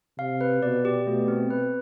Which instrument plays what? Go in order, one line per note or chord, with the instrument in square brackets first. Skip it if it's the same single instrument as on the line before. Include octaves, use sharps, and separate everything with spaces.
[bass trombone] C3 [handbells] F5
[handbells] B4
[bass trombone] B2 [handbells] D5
[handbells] G4
[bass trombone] B2 [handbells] A3
[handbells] C4
B4